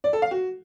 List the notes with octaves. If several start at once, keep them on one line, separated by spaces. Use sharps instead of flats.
D5
A4
F5
F#4